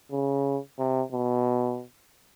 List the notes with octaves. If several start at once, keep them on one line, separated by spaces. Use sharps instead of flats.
C#3
C3
B2